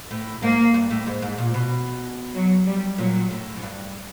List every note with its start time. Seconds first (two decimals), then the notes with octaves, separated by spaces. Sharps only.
0.11 A2
0.42 G#2 A#3
0.74 G2
0.90 A2
1.07 G#2
1.22 G#2
1.38 A#2
1.54 B2
2.35 F#3
2.67 G3
2.98 A#2 F#3
3.31 A2
3.56 F#2
3.62 G2